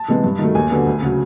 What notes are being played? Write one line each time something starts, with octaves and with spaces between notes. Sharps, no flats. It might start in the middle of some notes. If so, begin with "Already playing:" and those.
Already playing: A5
C3 E3 G#3 B3
G2
D#3 F#3 A3
D#2 G#5
D3 F#3 B3
D2
C#3 F#3